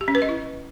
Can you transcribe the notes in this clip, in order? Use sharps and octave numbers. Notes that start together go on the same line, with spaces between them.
G4
C#4
B4
D#5
E4